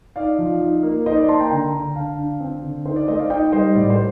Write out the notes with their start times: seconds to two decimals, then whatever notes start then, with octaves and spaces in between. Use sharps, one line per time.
0.16 D#4 D5 F5
0.38 F3
0.61 D#4
0.83 A#3
1.06 D#4 C5 D#5
1.17 D5
1.28 A#3 A5 C6
1.40 G5 A#5
1.51 D3 G5 A#5
1.74 D3
1.95 D3 F5 A5
2.17 D4
2.40 C4
2.63 D3
2.85 D#4 C5
2.96 D5
3.08 A3 C5 D#5
3.19 D5 F5
3.30 D#4 D#5 G5
3.52 G3 C5 D#5
3.75 A2 D5
3.90 C5